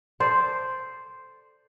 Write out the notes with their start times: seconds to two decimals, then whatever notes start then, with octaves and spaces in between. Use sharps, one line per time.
0.20 A4 C5 D5